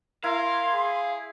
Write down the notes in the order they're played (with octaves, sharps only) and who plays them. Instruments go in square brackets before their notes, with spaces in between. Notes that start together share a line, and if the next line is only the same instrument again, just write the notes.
[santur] E4 [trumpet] A#4 [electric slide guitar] F5 [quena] C6
[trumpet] G#4